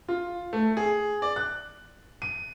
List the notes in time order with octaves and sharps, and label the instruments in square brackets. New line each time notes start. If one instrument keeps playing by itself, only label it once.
[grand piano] F4
A3
G#4
D5
F#6
D#7